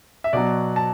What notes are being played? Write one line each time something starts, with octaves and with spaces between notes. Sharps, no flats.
E5
B2 F#3 D5
A5